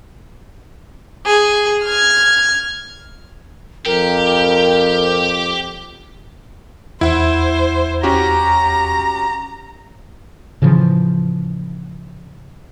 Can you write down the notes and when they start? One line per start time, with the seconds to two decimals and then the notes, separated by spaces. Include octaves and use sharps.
1.26 G#4
1.85 F6 G#6
3.86 F2 G4 A#4
7.01 E2 E4 C5 F#5
8.03 C#4 F#4 G4 A#5
10.62 A2 C#3 E3 F3